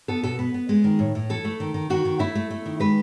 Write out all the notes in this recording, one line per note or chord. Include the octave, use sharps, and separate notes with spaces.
B3 A4
B2 A4
B3 B4
B3
G#3
D#3
A2
A2
E3 A4
A3
D#3
D#3
D#3 F#4
D#3
A3 E4
A3
A3
D#3
G#3 B4